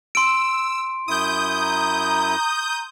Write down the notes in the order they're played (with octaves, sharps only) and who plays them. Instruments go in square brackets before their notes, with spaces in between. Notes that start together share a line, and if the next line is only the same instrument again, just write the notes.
[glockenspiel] C6 D7 [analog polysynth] E6
[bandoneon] F#2 E4 [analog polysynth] D#6 G6
[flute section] A#5